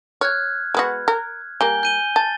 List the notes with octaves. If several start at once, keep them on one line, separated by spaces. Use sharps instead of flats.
C#5 F6 F#6 G#6
G#3 B3 F#4
A#4
G3 A#3 G#5 G6 G7
G6 D#7 G7
A5 A6